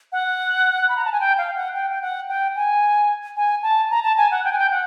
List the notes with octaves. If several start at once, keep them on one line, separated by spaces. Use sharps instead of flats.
F#5
B5
A#5
A5
G#5
G5
F5
F#5
G5
G5
F#5
G5
G#5
G#5
A5
A#5
A5
G#5
F#5
G5
G#5
G5
F#5